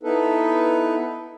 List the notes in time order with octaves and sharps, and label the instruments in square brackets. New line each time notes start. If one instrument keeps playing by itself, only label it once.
[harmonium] B3 D#4 E4 A4 B4